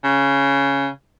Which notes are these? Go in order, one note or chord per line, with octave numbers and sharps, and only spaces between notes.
C#3